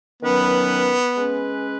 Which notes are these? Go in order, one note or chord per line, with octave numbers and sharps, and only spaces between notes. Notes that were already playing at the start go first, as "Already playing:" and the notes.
D#3 F#3 B3 C#4 B4
G#3 C#4 B4